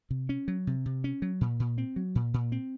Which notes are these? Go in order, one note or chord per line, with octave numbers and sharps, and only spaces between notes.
C3
C#4
F#3
C3
C3
C#4
F#3
A#2
A#2
C4
F#3
A#2
A#2
C4